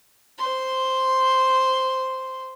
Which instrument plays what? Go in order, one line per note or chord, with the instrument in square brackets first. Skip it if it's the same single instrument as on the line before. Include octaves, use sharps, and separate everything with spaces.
[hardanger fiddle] C5 C6